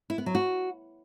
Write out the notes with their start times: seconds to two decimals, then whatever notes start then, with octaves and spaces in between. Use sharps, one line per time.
0.10 E4
0.18 B3
0.26 F#3
0.35 F#4